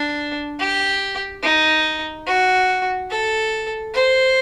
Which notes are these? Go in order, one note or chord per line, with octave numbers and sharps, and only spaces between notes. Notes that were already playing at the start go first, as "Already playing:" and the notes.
Already playing: D4
G4
D#4
F#4
A4
C5